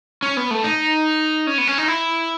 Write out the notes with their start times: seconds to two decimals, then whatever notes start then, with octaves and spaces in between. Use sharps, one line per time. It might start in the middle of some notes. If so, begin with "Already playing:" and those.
0.22 C#4
0.37 B3
0.51 A3
0.64 D#4
1.47 C#4
1.58 B3
1.67 C#4
1.78 D#4
1.88 E4